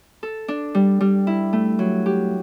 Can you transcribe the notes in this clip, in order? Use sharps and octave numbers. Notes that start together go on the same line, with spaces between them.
A4
D4
G3
G3
E4
A3
F#3
G4